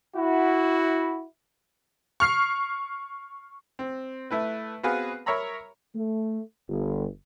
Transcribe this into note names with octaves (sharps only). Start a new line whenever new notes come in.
E4 F#4
C#6 F6 C7
C4
A3 E4 B4
B3 C4 F#4 G#4 B4 F5
A#4 C#5 E5 A#5 B5
A3
G1